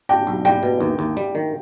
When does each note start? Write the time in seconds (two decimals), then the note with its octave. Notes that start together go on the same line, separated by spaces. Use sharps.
0.09 D4 G5
0.27 B1
0.45 G3 G5
0.63 B2
0.80 D#2
0.99 D#2
1.17 G3
1.35 D#3